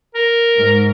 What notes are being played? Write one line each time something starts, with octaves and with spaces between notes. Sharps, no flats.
A#4
G#2